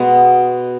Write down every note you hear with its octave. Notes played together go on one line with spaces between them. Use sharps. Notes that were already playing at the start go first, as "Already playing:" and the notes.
Already playing: B2 G#3 B3 F#4 G#4